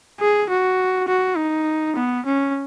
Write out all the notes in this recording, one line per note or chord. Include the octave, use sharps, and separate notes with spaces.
G#4
F#4
F#4
D#4
B3
C#4